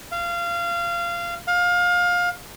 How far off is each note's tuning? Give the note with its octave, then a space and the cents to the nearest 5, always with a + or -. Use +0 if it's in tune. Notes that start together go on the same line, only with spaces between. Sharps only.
F5 -20
F5 +25